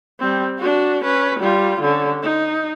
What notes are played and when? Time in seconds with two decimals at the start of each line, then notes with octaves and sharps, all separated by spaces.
0.19 G3 C4
0.58 D4 F#4
1.04 C#4 B4
1.40 G3 F4
1.81 D3 C#4
2.22 D#4